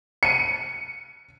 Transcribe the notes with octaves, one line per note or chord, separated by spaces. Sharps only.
C#7 D#7